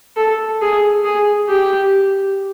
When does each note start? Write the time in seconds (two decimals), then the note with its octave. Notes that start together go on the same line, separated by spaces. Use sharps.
0.17 A4
0.62 G#4
1.04 G#4
1.49 G4